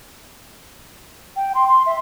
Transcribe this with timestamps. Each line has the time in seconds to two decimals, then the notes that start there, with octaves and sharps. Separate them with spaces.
1.36 G5
1.55 C6
1.68 C6
1.86 E5